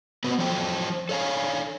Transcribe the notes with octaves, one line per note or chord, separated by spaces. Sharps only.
B3 C4 F#4 B4
F3 F#3 C5 G5
A4 C#5 F5 G#5